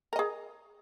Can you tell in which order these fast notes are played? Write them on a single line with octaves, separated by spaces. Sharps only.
A#4 D#5 G#4